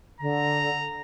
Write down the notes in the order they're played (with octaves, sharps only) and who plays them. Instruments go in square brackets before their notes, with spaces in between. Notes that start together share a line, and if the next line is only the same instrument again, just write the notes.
[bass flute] D3 [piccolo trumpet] A#5